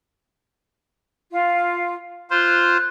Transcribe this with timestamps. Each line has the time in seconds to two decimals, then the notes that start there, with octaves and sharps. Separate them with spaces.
1.31 F4 F5
2.31 F4 C5 F#6